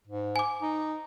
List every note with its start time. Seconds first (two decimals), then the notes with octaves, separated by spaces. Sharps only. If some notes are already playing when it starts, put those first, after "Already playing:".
0.08 G#2
0.36 G#5 D6
0.62 D#4